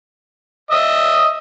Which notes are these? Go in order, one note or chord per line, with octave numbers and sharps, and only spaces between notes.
D#5 E5 D#6